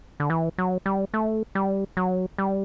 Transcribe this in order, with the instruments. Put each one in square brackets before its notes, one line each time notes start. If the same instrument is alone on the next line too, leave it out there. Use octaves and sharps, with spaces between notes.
[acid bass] D3
E3
F#3
G3
A3
G3
F#3
G3